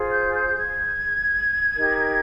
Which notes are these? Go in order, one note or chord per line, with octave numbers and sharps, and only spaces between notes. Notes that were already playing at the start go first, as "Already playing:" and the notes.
Already playing: F4 G#4 C5
G6
G6
G#6
D#4 G4 A#4